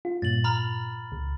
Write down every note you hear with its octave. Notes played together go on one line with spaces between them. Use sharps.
F4
G2 A#2 A6 F#7
A#5 B5 F6
C#2